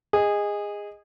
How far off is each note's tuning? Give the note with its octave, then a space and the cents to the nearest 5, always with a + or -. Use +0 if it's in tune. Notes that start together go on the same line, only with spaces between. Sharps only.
G#4 -20 D#5 +0